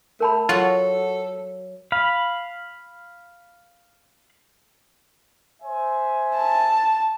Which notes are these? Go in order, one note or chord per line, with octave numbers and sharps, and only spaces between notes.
A3 A#4 A5 B5
F#3 F4 F#4 A4
F5 B5
C5 E5 G#5
A5